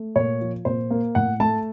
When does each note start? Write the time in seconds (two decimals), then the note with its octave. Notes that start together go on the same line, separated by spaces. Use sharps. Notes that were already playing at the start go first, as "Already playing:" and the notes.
Already playing: A3
0.16 A#2 C#5
0.41 F3
0.65 A#2 C5
0.91 A#3
1.15 A2 F#5
1.40 A3 A5